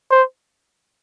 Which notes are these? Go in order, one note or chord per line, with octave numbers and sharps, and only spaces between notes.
C5